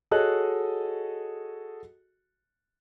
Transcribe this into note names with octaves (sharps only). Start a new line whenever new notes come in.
F#4 G#4 A4 C#5 D#5 F#6